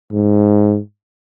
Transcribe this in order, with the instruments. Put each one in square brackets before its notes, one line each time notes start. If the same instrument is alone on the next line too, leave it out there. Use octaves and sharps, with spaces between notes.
[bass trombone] G#2